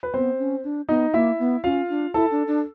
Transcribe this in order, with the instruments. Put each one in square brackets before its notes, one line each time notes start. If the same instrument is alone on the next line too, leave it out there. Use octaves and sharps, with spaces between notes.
[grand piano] B4
[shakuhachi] B3 [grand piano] C4 C5
[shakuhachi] C#4
D4
[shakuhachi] B3 [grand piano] D#4 D#5
[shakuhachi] A#3 [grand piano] E4 E5
[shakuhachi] B3
[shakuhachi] C#4 [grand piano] F4 F5
[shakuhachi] D4
[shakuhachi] E4 [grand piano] A4 A5
[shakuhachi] D4
D4